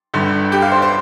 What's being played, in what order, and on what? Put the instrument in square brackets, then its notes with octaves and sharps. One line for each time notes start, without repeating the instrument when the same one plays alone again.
[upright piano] G1 G2 D3
G4
F5
C5
C5